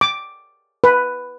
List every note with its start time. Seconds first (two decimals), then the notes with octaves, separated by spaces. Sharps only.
0.01 D6
0.84 B4